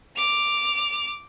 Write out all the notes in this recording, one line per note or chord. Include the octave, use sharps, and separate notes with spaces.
D6 F7